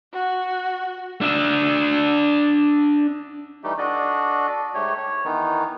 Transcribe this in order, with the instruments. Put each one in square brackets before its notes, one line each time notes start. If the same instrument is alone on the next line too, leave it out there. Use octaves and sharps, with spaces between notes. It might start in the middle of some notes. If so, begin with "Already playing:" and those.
[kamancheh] F#4
[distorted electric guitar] D4 E5
[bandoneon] E3 G3 A3 D#4 G4
D4 F#4 A4 D5 D#5
G#2 A3 G4 C#5
C#5
D#3 E3 B3 D#4